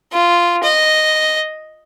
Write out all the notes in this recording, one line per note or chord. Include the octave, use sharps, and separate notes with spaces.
F4
D#5